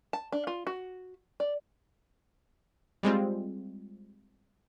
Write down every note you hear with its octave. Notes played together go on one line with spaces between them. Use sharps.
A5
D4
F4
F#4
D5
G3 G#3 C4 F4